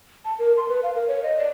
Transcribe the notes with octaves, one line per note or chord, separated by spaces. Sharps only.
A5
A#4
C6
B4
F5
A#4
C#5
D#5
D5